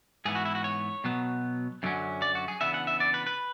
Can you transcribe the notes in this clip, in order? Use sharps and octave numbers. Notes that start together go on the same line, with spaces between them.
G#2 E3 B3 G#4
F#4
E4
F#4
C#5
B2 F#3 B3
F#2 D3 F#3 C#4
D5
F#4
G#4
C#3 E3 B3 D4 E5
F#5
E5
D5
B4
B4